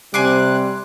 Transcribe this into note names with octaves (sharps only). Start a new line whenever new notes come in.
C3 G3 C4 G#5 C6 D6 F#6